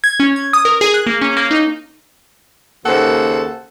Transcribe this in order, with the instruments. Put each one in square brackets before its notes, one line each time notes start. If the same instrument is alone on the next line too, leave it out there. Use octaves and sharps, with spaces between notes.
[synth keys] G#6
C#4
G#6
D#6
A#4
G#4
F#6
A#3
C#4
A#3
D#4
[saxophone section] D#2 C#3 A#3 A4 C5 F#5